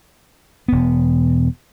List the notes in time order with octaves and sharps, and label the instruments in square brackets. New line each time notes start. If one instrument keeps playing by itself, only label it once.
[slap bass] E1 B3